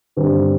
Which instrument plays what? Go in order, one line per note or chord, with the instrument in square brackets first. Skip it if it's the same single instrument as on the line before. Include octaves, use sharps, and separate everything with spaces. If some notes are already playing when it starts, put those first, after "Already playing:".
[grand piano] G1 G2 D3 G3 C4